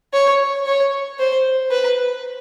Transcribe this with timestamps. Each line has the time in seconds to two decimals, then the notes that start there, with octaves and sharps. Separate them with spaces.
0.13 C#5
0.66 C#5
1.19 C5
1.71 B4